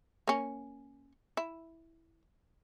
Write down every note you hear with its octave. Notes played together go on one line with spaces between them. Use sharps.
A#3 C#4
E4